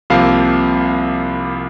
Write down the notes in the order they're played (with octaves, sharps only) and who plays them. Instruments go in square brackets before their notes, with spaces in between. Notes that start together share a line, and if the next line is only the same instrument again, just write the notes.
[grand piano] C2 C3 F3 A#3 F5